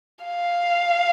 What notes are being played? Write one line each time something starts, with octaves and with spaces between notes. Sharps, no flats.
F5